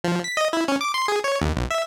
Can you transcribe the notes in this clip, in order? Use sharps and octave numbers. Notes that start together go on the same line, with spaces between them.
F3
B6
D#5
E4
C#4
D6
C6
G#4
C#5
D#2
B1
E5